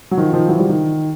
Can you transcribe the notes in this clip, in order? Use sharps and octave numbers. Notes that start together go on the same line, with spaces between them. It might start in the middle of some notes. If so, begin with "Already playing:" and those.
F#3
D#3 F3
D#3 F3
E3 F#3
F3 G3
D#3